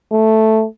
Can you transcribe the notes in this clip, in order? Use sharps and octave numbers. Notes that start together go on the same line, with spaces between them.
A3